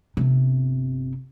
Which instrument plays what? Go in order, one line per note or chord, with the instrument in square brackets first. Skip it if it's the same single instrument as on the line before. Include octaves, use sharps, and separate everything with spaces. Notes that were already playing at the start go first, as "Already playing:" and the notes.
[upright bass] G1 C3